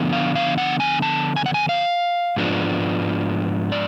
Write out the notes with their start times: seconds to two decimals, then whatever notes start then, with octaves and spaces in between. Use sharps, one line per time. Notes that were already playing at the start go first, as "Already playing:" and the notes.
Already playing: D3 F3 B3
0.12 F5
0.35 F5
0.58 F#5
0.80 G#5
1.02 A5
1.36 G#5
1.46 F#5
1.54 G#5
1.69 F5
2.36 G#2 F3 G#3 B3 D4
3.72 D5